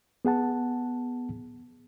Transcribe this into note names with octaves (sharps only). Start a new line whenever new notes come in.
B3 G#4 F#5 A5